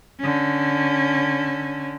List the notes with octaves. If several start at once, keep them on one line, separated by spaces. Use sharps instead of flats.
D3 C#4